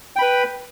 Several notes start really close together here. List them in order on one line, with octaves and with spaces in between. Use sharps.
G5 B5 B4